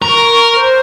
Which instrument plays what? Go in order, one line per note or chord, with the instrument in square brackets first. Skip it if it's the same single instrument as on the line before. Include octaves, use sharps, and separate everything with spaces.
[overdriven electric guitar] A#4 [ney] C#6
[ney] C5